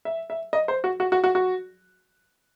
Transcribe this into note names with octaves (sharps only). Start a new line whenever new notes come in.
E5
E5
D#5
C5
F#4
F#4
F#4
F#4
F#4